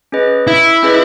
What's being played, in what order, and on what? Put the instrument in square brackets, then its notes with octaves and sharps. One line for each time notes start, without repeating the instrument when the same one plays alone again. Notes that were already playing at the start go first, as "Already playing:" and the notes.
[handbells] C#4 G#4 B4 D#5
[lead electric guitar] E4
[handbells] C#4 G#4 B4 D#5